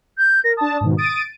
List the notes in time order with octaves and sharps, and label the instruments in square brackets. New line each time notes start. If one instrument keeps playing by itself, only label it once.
[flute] G6
[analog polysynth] A#4 [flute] A#6
[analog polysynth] D4 A5 [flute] D#6
[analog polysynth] G#2 B2 D#3
[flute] D#6 [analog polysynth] A6 D7 D#7